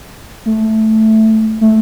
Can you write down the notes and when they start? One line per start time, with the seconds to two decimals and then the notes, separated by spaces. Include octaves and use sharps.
0.46 A3
1.61 A3